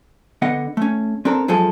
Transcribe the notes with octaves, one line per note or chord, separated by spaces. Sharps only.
D3 B3 D#5 F#5
A3 C#4
C4 D4 A4 A#4
F#2 F3 G#3 G#4 A4